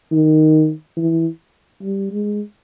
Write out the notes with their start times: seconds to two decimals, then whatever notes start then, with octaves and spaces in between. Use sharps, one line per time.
0.11 D#3
0.97 E3
1.82 G3
2.11 G#3